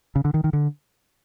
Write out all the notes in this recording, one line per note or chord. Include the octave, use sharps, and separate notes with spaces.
C#3
D3
D#3
D#3
D3